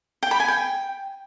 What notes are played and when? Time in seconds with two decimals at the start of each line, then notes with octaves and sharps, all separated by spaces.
0.23 G5
0.31 B5
0.40 G#5
0.48 G5